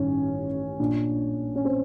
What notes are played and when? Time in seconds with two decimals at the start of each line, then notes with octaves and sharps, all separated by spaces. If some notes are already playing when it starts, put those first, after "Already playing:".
Already playing: A1 G2 D#3 C#4
0.79 A#1 A#2 D4
1.55 C#4
1.65 C4